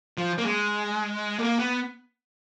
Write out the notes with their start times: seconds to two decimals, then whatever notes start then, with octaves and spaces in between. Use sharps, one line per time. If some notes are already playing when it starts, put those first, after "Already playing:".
0.18 F3
0.38 A#3
0.44 G#3
1.39 A#3
1.59 B3